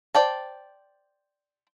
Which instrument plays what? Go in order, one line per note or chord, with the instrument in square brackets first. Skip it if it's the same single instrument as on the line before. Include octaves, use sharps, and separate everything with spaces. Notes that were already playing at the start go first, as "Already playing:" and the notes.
[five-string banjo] C5 D5 G5 A5